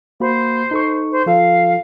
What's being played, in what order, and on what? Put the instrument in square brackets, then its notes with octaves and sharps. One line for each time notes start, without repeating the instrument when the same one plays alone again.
[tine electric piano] A#3 F#4 B5 [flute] C5
[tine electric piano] D#4 A4 C#6
[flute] C5
[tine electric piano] F3 F4 A4 [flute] F5